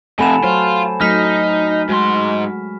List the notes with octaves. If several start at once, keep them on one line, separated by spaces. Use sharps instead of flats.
F2 C3 A3 A4 F#5 G#5 B5 E7
F#3 F4 C5 C#5
F#3 A3 D#4 F6 B6
G#2 G#3 F#4 C6